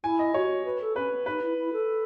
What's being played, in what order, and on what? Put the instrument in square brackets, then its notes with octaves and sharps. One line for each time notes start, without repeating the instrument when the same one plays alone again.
[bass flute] E4 [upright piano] G#5
[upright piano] D#5
[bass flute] F#4 [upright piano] C#5
[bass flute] B4
A4
[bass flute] C#4 [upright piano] B4
[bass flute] B3
[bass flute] D#4 [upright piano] B4
[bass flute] E4
E4
A4